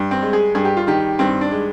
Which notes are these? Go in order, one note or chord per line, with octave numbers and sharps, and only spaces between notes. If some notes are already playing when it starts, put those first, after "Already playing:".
Already playing: G2
C4
G#3
G#4
G2 G#4
G4
F4
D#3 G4
G2 C4
D4
G#3